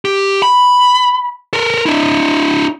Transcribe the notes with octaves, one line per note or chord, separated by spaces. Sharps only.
G4
B5
A4 A#4
D4 E4